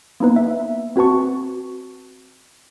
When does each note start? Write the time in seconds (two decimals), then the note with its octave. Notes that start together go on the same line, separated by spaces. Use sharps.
0.20 A#3 B3 D#4 B4
0.36 E5
0.96 C4 F#4 B4 A5 C#6